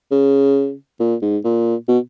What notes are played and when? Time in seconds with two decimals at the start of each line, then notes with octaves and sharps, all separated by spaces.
0.11 C#3
1.00 A#2
1.22 G#2
1.44 A#2
1.88 B2